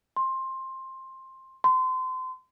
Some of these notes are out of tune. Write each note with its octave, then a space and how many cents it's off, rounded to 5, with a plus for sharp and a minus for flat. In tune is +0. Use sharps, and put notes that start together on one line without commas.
C6 +15
C6 -30